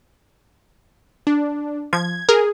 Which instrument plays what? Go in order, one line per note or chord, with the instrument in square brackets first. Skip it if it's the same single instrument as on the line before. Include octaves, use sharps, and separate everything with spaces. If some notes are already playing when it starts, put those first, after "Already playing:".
[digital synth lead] D4
[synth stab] F3 [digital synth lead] G#6
[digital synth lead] G#4 [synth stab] A#4